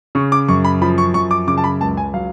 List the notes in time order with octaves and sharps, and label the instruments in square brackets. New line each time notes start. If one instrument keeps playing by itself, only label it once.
[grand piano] C#3 C#6
D6
F#2 C#6
B5
F3 B5
C#6
F#2 C#6
D6
C#3 D6
A5
B5
C#2 A5
G#5
F#3 F5